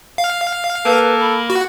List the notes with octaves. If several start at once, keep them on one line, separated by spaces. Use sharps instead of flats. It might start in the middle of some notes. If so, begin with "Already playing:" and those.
F5
A#3 A4 B4
B5
F#4